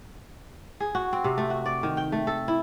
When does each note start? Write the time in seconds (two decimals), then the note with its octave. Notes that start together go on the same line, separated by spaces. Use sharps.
0.80 G#4
0.95 F#4
1.13 C4
1.24 C3
1.38 A3
1.50 F#4
1.66 D5
1.83 D#3
1.97 G5
2.12 A3
2.27 A4
2.48 E4